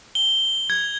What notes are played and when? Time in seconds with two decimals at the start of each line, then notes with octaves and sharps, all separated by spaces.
0.15 G7
0.70 G#6